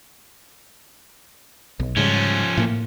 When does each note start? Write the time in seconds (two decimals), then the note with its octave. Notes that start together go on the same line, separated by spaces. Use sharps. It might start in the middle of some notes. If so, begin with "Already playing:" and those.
1.80 B1
1.97 G#2 C#3 F3 G3 C#4
2.57 A2 A#3